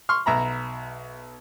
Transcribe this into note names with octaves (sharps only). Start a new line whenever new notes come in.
C6 C#6 F6
B1 E5 A#5 B5